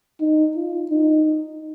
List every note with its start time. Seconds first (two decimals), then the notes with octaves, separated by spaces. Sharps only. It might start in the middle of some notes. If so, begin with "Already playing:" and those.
0.20 D#4
0.56 F4
0.91 D#4